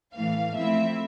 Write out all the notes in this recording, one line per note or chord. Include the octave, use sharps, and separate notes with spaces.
A2 E3 A3 F5
F3 A3 C4 E4 E5